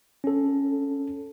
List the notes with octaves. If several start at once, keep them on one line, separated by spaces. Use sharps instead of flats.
C#4 A4